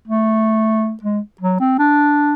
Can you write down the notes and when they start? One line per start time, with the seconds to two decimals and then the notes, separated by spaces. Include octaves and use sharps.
0.07 A3
1.03 G#3
1.41 F#3
1.60 C4
1.79 D4